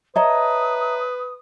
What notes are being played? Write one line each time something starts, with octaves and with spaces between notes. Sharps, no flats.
B4 C#5 D#5 E5 A5 A#5 D#6